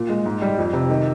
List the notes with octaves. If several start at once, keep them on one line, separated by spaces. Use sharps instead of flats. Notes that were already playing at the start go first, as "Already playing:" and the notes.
Already playing: A#2
G#3
G#2
G3
F2
C3
D#3